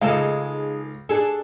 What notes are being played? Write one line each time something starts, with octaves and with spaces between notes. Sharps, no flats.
C#2 G#3 D#4 A4 F5
D4 G#4 A4